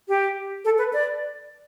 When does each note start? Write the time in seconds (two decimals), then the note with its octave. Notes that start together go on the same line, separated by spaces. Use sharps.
0.08 G4
0.65 A4
0.78 B4
0.93 D5